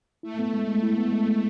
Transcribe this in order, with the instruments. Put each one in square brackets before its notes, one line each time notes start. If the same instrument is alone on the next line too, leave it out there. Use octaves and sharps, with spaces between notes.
[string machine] A3 [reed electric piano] E4
[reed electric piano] B3
G#3
G#3
E4
B3
G#3
G#3